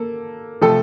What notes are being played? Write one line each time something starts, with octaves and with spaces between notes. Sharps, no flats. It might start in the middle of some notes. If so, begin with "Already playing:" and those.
Already playing: A#3 A4
C3 F3 A3 A4